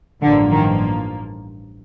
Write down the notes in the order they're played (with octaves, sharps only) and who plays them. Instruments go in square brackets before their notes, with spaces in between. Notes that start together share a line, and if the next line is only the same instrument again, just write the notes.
[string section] A1 G2 F3 A#3 [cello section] D3
[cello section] D#3